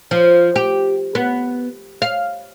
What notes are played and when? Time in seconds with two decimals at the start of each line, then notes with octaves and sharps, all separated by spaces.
0.11 F3
0.56 G4
1.15 B3
2.02 F5